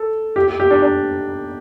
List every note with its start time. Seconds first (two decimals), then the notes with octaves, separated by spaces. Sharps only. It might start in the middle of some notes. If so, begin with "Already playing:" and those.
Already playing: A4
0.36 G4
0.48 G4
0.60 G4
0.71 D4
0.82 D4